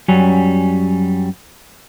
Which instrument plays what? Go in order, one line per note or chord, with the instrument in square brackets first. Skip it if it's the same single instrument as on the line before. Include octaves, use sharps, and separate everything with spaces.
[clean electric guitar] F#2 F#3 G3 C#4